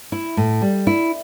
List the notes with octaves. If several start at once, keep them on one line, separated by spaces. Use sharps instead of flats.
E4
A2
G3
E4